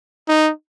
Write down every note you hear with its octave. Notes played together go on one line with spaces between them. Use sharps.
D#4